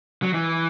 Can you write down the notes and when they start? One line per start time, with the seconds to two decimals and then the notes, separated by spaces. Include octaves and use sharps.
0.23 F#3
0.34 E3